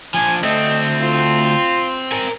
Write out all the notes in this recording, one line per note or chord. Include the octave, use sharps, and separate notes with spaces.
F3 D4 G#5
D2 A3 C4 D#5
F4
A#4 G#5